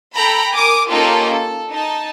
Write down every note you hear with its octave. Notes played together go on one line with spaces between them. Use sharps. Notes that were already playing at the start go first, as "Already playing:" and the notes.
A4 G5 A#5 B5
A#4 G#5 D6 D#6
A#3 C#4 D#4 F4 G4 A4
A4
D#4 A5